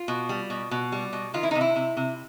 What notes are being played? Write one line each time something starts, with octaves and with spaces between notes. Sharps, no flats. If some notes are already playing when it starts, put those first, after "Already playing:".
Already playing: F4
B2
G3
B2
B2
G3
B2
D#3 F4
E4
D#4
C3
E4
C3
C3